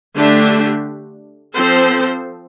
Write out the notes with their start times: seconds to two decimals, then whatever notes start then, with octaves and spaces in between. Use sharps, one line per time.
0.15 D3 A3 D4 G4
1.54 F3 C4 A4 C5